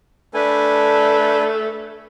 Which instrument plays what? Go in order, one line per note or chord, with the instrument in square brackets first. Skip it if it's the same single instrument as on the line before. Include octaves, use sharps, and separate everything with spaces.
[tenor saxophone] A3 [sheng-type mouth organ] D4 B4 G#5